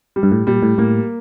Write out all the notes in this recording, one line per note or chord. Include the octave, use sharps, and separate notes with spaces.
G3
G2
A2
A#2 G3
A2
A2 A#3